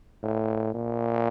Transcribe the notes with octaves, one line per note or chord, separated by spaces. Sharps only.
A2
A#2